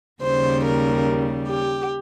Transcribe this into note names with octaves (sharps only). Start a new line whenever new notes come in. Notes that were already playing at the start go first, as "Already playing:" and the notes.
D#2 C#3 G3 C5
A#4
G4